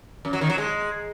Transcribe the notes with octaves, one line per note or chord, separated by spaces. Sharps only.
F#2
F#3
D#3
F#3
G#3